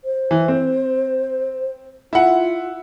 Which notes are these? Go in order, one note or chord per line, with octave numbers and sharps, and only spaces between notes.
C5
E3
C4
E4 F4 F#5